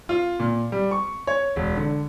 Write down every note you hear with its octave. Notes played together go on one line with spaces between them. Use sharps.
F4
A#2
G3
C#6
C#5
E1
D3